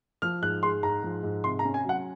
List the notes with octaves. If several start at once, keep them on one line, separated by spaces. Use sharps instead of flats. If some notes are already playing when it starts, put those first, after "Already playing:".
F3 F6
G#2 F#6
G#3 C6
G#2 A#5
F3
G#2
C3 C6
A#5
C#4
G#5
F#3
F#5